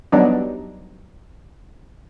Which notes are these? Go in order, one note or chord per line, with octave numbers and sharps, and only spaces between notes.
F#3 G3 B3 D4 D#4